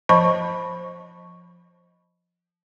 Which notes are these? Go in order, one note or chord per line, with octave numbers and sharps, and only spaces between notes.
F3 C5 D#5 A5 B5 C#6